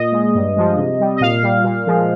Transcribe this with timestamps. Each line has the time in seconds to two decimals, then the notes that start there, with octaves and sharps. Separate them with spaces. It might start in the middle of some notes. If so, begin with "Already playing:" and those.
Already playing: A#2 D#5
0.12 G#3
0.35 G2
0.57 F3 G#3
0.78 C3
1.00 G3
1.16 D#5
1.21 A#2 F5
1.43 G3
1.64 A#2
1.87 F3 G#3